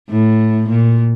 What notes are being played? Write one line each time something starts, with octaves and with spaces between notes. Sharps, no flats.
A2
A#2